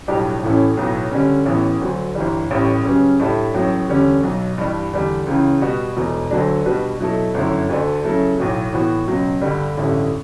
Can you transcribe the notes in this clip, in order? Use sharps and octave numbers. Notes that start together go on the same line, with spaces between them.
B1 A2 G3 D4 G4
A1 A2 E3 A3 C#4
B1 A2 F#3 B3
D3 G3 C#4
A1 A2 E3 B3
D2 D3 F#3
G1 G2 E3 G3
A1 A2 G3
C#3 F#3 C#4 G4 B4
A2 G3 D4 A4 E5
A1 A2 F#3
E2 D3 G3 C#4
B1 B2 F#3
G2 E3 G3 D4
E2 D3 G3
C#2 C#3 E3
B2 G3 B3 F#4
E1 E2 B2 A3
D2 D3 F#3 A3 D4
B2 G3 D4 F#4 B4
B2 F#3 A3 E4 A4
G1 F#2 D3 A3 E4
D2 D3 A3 D4 A4
C#3 F#3 A3 E4 A4
B1 A2 F#3
A2 E3 B3 F#4
C#2 B2 F#3
G2 D3 G3
A1 G2 D3 A3 E4